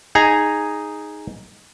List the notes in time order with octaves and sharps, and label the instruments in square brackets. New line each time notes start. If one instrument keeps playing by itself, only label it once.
[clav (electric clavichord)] D#4 G#4 G#5 A#5